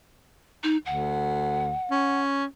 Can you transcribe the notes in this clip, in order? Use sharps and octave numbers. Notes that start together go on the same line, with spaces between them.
D#4
D2 F#5
C#4